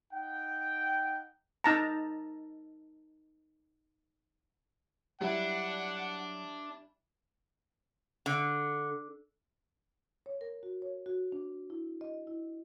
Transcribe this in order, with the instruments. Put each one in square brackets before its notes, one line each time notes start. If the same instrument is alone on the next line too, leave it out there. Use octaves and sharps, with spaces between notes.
[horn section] D#4 F#5 G5
[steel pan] D#4 A5 A#5
[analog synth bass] F#3 [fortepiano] G3 E4 [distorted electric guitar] D4 [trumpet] F#5
[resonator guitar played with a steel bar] D3
[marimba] C#5
A#4
F#4
C#5
F#4
D4
E4
D#5
E4